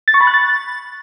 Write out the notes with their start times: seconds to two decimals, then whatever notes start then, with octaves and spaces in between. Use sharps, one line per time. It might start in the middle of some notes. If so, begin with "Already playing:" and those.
0.08 A6
0.14 C#6
0.21 B5
0.27 F#6
0.34 A6